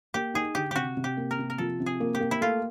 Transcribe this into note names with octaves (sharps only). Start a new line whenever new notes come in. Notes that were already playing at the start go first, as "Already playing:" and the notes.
A#3 G4
D#4 G#4
D3 G4
C3 F#4 G4
C3
G4
A#3
A#4
C3
A#4
F3 A4
C3
G#4
A#3
G4
A#3
E4
A3 F4